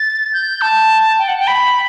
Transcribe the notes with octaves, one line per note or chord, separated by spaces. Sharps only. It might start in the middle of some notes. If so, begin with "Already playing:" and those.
Already playing: A6
G6
A5
G5
F#5
G5
B5